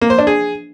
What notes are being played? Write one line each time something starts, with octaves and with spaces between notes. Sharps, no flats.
A#3
C5
D4
G#4